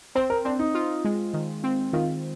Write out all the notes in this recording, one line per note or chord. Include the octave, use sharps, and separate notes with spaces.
C4 C5
A#4
C4 D4
D#4
F4
G#3
D#3
C4
D#3 F4